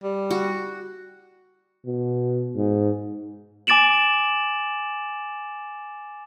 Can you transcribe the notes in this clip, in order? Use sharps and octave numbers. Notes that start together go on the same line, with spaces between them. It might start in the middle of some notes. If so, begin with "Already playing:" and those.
G3
F#4
B2
G#2
G#5 D6 A6 D7 E7 F#7